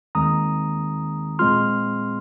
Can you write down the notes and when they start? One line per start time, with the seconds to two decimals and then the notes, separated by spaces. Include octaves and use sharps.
0.15 D#2 D#3 G#3 C4 A#5 D#6
1.39 A#2 G#3 C4 F4 C6 F6